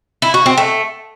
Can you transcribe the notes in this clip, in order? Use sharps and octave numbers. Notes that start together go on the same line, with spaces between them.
E4
F#4
C4
A3